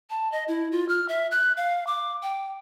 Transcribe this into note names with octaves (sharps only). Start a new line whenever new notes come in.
A5
D#5
E4
F4
F6
E5
F#6
F5
D6
G5